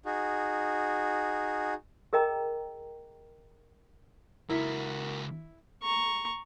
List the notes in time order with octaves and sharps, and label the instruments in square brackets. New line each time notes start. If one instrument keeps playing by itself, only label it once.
[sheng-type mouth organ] D#4 F#4 G#4
[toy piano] G#4 A#4 D#5 G5 A#5
[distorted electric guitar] C#2 F#4 [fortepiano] E4 [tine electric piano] A#4 B6
[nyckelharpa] A#5 C#6